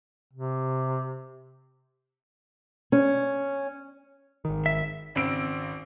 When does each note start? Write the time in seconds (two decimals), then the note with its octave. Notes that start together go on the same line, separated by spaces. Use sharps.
0.33 C3
2.92 C#4
4.45 G#1 D#3
4.66 E5
5.15 G#1 C#3 C4 E6 D7